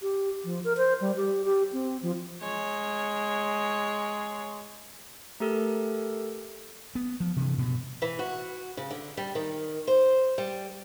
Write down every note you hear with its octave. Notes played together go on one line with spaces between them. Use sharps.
G4
F3
A#4
C5
G3
G4
G4
C4
F3
G#3 C#5
A3 G4 A4 A#4
B3
F3
C3 E3
G2 B2
E3
F#4
C#3
D3
G3
D#3
C5
G3